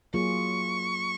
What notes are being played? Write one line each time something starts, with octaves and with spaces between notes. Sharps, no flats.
F#3 A#3 F4 G#4 C#6